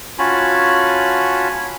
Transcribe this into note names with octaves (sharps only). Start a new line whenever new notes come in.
C#4 F4 F#4 G#5 A5 B5